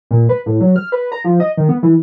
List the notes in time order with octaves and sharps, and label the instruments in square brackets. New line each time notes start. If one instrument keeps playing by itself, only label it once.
[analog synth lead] A#2
B4
A2
F#3
F6
B4
A#5
F3
D#5
D#3
B3
E3